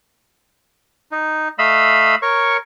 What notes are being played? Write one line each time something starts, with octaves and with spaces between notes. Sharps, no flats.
D#4
A3 D#5 F5 B5 E6
A#4 C#5 C#6